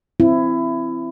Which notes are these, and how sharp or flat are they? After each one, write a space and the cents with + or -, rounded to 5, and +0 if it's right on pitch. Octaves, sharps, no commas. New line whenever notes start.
C4 -5 E4 +20